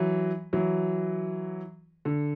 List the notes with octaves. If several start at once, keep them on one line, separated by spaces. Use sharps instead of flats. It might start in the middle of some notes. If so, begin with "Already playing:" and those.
Already playing: E3 F#3
E3 F#3
D3